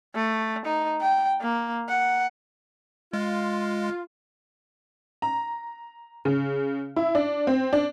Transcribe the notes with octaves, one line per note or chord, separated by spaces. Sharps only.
A3
D#4
G5
A#3
F#5
G#3 F4
A#5
C#3
E4
D4
C4
D4